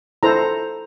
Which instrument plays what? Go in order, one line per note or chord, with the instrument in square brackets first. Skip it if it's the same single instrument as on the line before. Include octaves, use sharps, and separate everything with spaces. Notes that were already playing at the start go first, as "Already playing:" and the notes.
[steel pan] E4 A4 C5 A#5